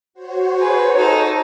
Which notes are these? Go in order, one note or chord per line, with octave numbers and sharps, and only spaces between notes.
F#4 C5 C#5
G#4 B4
D#4 A4